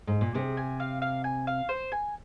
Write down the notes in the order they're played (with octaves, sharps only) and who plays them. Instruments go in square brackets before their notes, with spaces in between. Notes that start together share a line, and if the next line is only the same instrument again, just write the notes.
[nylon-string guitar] G#2
A#2
[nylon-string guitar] C3 [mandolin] G#4
[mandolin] G#5
F5
F5
G#5
F5
C5
G#5